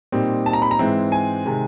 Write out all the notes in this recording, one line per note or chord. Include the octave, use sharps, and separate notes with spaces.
A#2 G3 C4 D#4
A5
A#5
B5
A#5
G#2 E3 G#3 C4 E4
G#5
C3 D#3 G#3